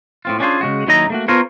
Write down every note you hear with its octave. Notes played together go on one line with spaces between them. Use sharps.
A2 C4 F4
C#4 D4 F4 G#4 C5
C#3 G#3 F#4
D#2 F#3 D#4 E4 D#5 A#5
A3 A#3 F#4
B3 F4 A4 A#4 C5 C#5